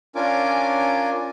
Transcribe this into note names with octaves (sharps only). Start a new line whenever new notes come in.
C#4 D4 F4 A#4 G#5 D6